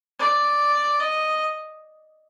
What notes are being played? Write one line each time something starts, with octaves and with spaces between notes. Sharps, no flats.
D5
D#5